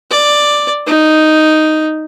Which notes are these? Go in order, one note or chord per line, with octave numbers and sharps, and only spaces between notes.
D5
D#4